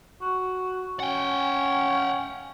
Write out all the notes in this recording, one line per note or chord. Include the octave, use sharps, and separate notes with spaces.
F#4
C#4 F#5 G5